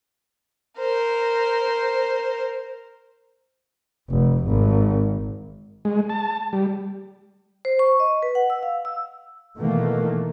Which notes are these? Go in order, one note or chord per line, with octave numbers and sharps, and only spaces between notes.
A#4 C5
F1
G#1
G#3
A5
G3
C5
C#6
D#5
B4
F#5
E6
F5
E6
B2 D#3 E3 A3 A#3